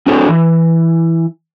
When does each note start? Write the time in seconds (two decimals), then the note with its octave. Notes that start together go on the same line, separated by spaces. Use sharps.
0.07 C4 D4 F#4 G#4 A4 C#5
0.28 E3